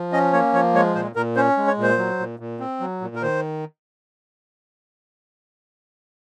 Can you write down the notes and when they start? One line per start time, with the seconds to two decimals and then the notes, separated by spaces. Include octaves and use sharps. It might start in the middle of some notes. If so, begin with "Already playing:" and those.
Already playing: F3
0.12 C#4 D#5
0.33 A#3 C#5
0.53 F3 C#5
0.74 G#3 C#5
0.95 A#2 C5
1.15 A#2 A#4
1.36 C#4 C5
1.57 G#3
1.67 C#5
1.77 A#2
1.83 C5
1.98 F#3
2.19 A#2
2.39 A#2
2.60 C4
2.80 F#3
3.01 A#2
3.15 A#4
3.22 D#3 C5